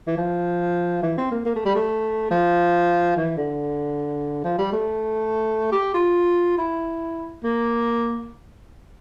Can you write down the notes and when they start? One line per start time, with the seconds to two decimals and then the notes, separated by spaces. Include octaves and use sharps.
0.07 E3
0.17 F3
1.02 E3
1.17 C4
1.31 A#3
1.45 A#3
1.55 A3
1.65 G3
1.75 A3
2.30 F3
3.16 E3
3.37 D3
4.44 F3
4.58 G3
4.72 A3
5.72 G4
5.94 F4
6.57 E4
7.43 A#3